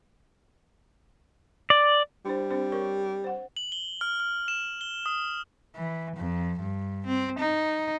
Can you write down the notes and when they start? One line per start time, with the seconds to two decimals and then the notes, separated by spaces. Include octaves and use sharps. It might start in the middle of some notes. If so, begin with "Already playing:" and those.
1.70 D5
2.25 G3 D4 E4 C5
2.51 C4 D4 C5
2.72 A#4 C#5 C#6
3.24 C5 F#5
3.57 F#7
3.72 G7
4.01 F6
4.20 F6
4.48 E7
4.81 G7
5.06 D#6
5.76 E3
6.17 F2
6.60 G2
7.06 C4
7.39 D#4